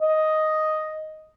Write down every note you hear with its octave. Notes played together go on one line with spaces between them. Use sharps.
D#5